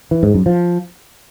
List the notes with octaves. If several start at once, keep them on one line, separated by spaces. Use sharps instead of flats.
E3
G#2
F#2
F3